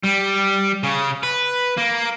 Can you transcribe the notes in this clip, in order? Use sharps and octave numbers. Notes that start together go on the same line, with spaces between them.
G3
C#3
B4
A#3